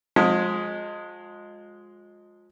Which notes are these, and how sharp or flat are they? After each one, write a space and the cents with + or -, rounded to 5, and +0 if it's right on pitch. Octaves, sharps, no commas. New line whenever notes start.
F3 +35 G#3 +0